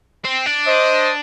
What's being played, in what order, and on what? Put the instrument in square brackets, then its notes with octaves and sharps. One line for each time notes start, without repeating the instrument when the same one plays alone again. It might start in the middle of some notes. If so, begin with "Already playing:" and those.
[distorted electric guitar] C4
D4
[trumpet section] C5 D#5